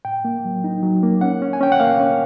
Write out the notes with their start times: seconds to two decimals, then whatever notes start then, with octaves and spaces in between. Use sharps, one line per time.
0.05 A2 G5
0.25 A#3
0.45 F#3
0.64 D#4
0.83 F#3
1.03 A#3
1.21 C#4 F#5
1.42 C#4
1.53 G#5
1.61 C#4 G5
1.72 F#5
1.80 A#3 F5
2.00 C#4